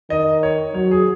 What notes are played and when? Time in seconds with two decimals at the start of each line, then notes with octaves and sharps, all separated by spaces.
0.10 D#3 D#5
0.43 C#5
0.74 F#3 C#5
0.91 G#4